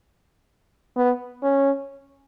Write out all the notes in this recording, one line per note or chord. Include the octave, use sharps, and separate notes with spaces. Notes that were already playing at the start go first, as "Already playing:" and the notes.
B3
C#4